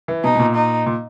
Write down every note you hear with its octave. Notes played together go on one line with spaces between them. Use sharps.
E3
B2 D#4
B2
A#2
D#4
A#2